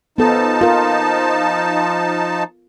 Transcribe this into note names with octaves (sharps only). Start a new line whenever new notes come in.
F3 B3 D#4 A4 A5
F4 A#4